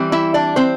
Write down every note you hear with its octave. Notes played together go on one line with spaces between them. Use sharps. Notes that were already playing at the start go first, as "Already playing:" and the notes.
Already playing: E3 G3 C4
E4 E5
D4 D5
C4 C5